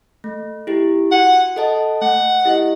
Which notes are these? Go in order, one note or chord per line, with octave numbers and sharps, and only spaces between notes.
A3
E4 G4
F#4 F#5
A4 D#5 F#5 A5
A3 F#5
E4 G4 D#5